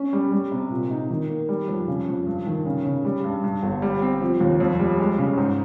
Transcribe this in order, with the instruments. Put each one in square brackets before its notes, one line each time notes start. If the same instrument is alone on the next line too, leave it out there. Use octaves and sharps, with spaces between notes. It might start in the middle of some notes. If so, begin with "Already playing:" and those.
Already playing: [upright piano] C#4
G3
G3
C3
A#2
D#4
D#3
A#3
G3
F2
C#3
F2
G2
D#3
C#3
C#3
G3
G2
G2
G1
G3
C4
F3
D#2
F2
G3
G#3
C#3
G#2